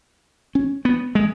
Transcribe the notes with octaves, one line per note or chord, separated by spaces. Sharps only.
C#4
B3
G#3